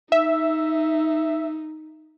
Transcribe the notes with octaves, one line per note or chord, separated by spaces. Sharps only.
D#4 E5